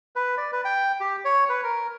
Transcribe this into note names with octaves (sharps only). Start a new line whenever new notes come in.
B4
D5
B4
G5
G4
C#5
B4
A#4